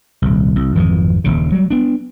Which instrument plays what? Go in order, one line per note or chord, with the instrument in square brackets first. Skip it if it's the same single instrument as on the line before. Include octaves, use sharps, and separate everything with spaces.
[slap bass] D#1 C2
C2
G#1 F2 D3 E3
D#1 G#1 C#3
F#3 G3
B3 D4